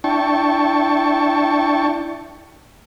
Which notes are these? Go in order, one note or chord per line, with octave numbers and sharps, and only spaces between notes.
D4 E4 G5 A5 C#6